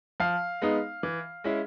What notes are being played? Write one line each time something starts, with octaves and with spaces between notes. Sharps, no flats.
F3 F5
G#3 B3 D#4
E3
G#3 C#4 E4